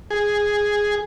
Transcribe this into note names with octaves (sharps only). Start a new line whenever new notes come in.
G#4